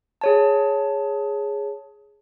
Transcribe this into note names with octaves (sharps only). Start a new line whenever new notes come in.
G#4 C#5 A5